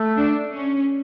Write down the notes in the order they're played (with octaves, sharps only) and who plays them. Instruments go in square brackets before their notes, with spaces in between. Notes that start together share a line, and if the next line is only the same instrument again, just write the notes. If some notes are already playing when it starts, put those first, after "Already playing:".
Already playing: [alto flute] A3
[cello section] D4
C#4